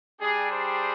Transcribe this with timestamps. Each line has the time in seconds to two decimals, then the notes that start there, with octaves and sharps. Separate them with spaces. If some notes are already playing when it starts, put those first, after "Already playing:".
0.20 G3 D4 G4 G#4
0.50 G#4 C5